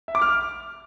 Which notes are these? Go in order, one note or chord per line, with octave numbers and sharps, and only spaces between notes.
E5
D6
F6